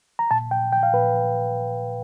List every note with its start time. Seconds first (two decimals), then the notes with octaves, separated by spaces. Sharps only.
0.19 A#5
0.31 A#2 A5
0.51 A#2 G5
0.72 A#2 G5
0.83 F5
0.93 A#2 B4